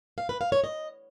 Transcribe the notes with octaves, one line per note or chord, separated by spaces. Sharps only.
F5
B4
F5
C#5
D#5